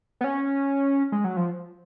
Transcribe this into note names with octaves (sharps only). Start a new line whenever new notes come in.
B3
C#4
G#3
F#3
F3